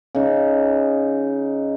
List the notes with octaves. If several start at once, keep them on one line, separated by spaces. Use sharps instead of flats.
C#3 D#4